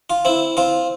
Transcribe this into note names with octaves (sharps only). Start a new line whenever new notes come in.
F4
C4 E4
C4 F4